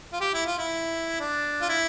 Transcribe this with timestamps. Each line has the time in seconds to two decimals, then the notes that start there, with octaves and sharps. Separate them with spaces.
0.13 F4
0.21 G4
0.34 E4
0.46 F4
0.59 E4
1.20 D4
1.61 F4
1.69 E4